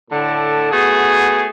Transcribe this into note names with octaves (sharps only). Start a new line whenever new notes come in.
A2 D3 A5
A3 B3 F#4 G#4